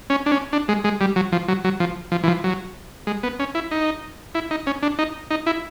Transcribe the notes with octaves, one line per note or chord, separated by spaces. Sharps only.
C#4
D4
C#4
D4
G#3
G#3
G3
F#3
F3
F#3
F#3
F3
F3
E3
F3
F#3
G#3
B3
C#4
E4
D#4
E4
D#4
C#4
D4
D#4
D#4
E4